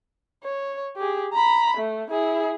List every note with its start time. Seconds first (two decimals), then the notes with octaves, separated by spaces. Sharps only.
0.44 C#5
0.97 G4 G#4
1.33 A#5 B5
1.77 A3
2.10 E4 G#4